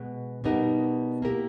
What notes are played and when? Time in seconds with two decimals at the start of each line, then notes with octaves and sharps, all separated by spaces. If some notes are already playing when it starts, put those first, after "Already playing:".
Already playing: B2 G#3 B3
0.44 B2 G3 B3 D#4 A#4
1.22 A#3 E4 G4 A#4